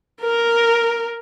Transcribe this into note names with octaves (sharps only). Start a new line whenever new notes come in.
A#4